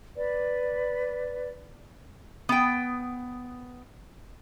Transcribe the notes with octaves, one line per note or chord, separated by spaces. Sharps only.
B4 D5
B3 G5